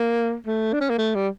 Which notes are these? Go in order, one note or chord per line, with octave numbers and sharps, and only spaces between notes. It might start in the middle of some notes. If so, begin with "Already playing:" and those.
Already playing: A#3
A3
D4
C#4
A#3
A3
G3